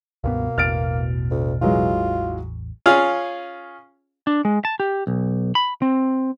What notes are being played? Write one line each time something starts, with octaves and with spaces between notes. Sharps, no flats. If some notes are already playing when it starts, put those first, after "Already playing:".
C#2 G2 B2 A#3 B3
A1 E2 F6 A6 D7
D2
E3 F#3 G#3 F4
C#4 F4 G#4 F5
D4
G#3
A5
G4
B1
B5
C4